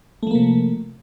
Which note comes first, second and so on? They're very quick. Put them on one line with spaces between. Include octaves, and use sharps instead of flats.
A3 F3 A#3 C3